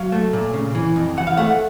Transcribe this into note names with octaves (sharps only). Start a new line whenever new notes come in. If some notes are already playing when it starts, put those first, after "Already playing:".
Already playing: F#3 F5
A3
A#2
C#3
E3
F2
E3 F#5
F5
A3 F#5